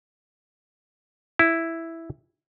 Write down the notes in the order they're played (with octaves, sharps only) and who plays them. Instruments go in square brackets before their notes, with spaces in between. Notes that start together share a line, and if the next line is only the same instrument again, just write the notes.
[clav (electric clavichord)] E4